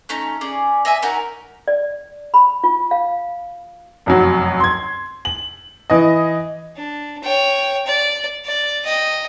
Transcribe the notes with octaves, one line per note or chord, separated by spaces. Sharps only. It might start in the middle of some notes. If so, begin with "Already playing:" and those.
A3 C#4 D#4
C#4 G#4 D5
D#5 E5 G#5
C#4 D#4 F#4 A#4
D5
B5
F4
F5
F1 F#2 F#3
C6 G#6
F#7
E3 D#5
D4
C#5 G5
D5
D5
D#5 G5